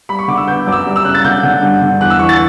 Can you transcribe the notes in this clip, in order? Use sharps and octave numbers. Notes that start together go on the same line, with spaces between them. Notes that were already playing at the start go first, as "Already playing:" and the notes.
G3 B5
C#6
D3 D6
E6
B3 G6
F#2 D6
E6
G3
E6
C#3 F#6
A6
D3 G6
D3
G2
D3
E2 F#6
E6
E3 C#6
A6